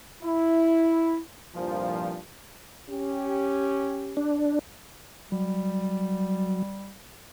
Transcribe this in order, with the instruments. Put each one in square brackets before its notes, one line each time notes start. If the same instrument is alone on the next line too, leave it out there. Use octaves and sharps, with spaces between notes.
[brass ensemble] E4
C2 G2 A#2 F3
[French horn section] C#4 G4
[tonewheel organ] D4
[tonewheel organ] F#3 [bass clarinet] G3